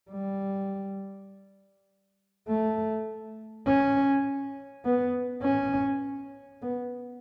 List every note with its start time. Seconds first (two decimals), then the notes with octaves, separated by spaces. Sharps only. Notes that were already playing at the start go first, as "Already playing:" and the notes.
0.11 G3
2.48 A3
3.66 C#4
4.85 B3
5.43 C#4
6.62 B3